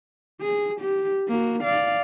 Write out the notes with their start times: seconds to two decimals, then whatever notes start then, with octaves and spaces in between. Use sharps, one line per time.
0.41 G#4
0.80 G4
1.28 A#3 F#4
1.62 D5 F5